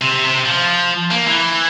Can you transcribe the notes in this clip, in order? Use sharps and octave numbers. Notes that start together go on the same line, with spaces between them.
C3
C3
F3
A#3
E3